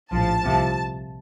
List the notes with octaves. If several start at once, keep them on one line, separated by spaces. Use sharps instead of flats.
A#1 A2 F3 A5
C2 C3 F3